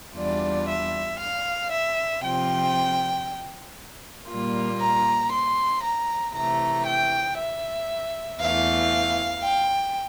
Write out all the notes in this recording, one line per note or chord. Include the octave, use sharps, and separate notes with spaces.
E2 E3 G3 D4 F4 D5
E5
F5
E5
C3 F3 C4 F4 G5
A#2 G3 A#3 F4
A#5
C6
A#5
C3 E3 A3 A#5
G5
E5
E2 E3 A3 F5
G5